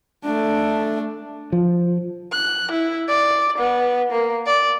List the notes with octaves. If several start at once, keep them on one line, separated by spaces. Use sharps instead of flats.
A3 D4
F3
F#6
E4
D5
B3
A#3
D5